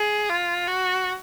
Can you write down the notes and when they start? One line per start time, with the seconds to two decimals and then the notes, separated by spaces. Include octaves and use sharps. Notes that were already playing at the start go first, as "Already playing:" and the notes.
Already playing: G#4
0.29 F4
0.67 F#4